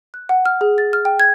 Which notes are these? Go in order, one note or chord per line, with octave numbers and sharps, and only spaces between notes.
F#6
F#5
F6
G#4
A6
F6
G5
G#6